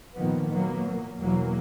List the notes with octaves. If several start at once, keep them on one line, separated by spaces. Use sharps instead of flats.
A#2 D#3 F3 A#3 B3
F#3 A#3 B3
A#2 A#3
E2 B2 E3 F#3 A#3